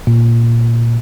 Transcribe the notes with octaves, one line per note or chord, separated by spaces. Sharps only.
A#2